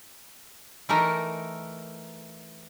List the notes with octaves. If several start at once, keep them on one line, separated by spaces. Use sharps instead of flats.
E3 A3 D#4 A#4